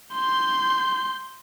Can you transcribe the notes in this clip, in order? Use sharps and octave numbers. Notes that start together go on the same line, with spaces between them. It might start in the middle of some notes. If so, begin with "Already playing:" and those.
C6 G6